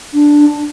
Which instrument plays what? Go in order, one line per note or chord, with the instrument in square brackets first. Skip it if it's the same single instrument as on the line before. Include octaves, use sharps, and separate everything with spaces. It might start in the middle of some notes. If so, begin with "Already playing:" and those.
[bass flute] D4